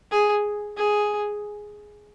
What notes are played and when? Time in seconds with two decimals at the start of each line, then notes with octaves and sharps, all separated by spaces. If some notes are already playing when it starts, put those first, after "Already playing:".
0.11 G#4
0.77 G#4